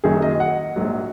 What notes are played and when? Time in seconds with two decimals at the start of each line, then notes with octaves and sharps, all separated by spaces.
0.04 F#1 F#2 D#3 F#3 G#4
0.22 D#5
0.40 F#5
0.76 A#1 G#2 F#3